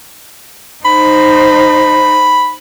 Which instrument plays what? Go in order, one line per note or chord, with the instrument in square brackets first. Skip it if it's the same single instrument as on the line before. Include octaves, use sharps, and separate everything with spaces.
[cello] D#4 C5 [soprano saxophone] B5